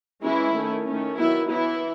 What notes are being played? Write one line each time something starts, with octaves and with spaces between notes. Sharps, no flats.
E3 G#3 C#4 E4
D#3 A3 C#4
D#3 A3 C#4
D#3 F#3 B3 E4
E3 B3 E4